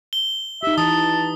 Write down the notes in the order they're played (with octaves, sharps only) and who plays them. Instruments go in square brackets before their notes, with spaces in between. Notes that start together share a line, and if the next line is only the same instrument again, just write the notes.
[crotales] G7
[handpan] D#4 G4 [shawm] E5
[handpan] E3 [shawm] A5 [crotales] D#6